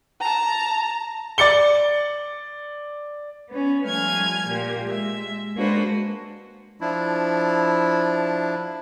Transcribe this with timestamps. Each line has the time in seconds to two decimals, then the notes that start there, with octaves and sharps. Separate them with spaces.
0.20 A5 A#5
1.38 D5 A6 C#7 G7
3.49 B3 C#4
3.85 F3 G3 A3 G#5 F6 G#6
4.47 A#2 A#3 G4
4.89 G#3 E5
5.56 G#3 A#3 D4 F#4 B4 C5
6.81 F3 D4 E4